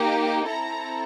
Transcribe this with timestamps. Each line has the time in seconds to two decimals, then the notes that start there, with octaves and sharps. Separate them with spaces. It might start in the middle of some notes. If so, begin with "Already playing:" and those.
Already playing: A#3 D#4 G4
0.47 C4 E4 A4 A#5